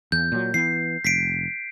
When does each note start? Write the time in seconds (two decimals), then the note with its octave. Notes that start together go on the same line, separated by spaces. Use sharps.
0.12 E2 G6
0.32 A#2 F#3
0.54 E3 B3 C7
1.05 F1 B6 C7 D7